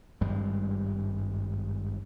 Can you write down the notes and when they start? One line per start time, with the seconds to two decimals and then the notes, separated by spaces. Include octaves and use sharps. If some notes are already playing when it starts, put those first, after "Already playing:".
0.21 G#1 G2 G3 G#3